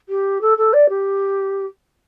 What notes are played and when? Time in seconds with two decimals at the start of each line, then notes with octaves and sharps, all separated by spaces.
0.09 G4
0.41 A4
0.58 A4
0.73 D5
0.89 G4